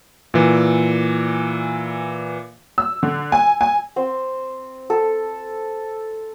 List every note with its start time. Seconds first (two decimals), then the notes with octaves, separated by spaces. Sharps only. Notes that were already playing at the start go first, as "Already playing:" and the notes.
0.34 A#2 E3
2.78 E6
3.03 D3
3.32 G#5
3.61 G#5
3.96 C4
4.90 A4